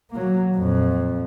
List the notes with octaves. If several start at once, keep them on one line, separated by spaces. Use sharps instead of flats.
F#3 A#3
F2 A#2